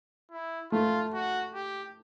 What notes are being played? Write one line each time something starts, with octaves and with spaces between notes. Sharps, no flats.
E4
A3 F4
F#4
G4